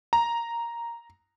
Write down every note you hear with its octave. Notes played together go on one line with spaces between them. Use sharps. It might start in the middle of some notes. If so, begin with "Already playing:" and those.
A#5